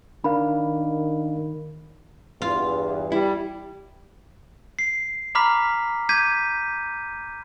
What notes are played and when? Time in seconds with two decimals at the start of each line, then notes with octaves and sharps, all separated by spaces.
0.24 D#3 D4 A#4 F5 B5
2.42 E2 G2 F4
3.12 G3 E4
4.79 C7
5.35 A#5 B5 D6 F6 B6
6.09 D6 G6 G#6 B6 D#7